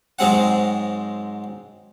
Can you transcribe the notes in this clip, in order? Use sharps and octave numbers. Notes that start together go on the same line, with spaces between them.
G#2 F#3 G#3 C4 F#5